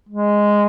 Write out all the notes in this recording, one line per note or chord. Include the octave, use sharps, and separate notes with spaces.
G#3